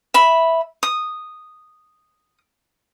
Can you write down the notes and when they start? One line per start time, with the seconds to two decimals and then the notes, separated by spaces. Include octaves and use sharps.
0.14 E5 B5
0.83 D#6